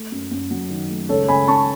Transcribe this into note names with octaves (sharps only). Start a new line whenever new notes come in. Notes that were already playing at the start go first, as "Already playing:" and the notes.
Already playing: A3
F#2
F#2
F#3
D#3
A3
C#2 A4 C#5
C#2 G#5 B5
C#4 A5 C#6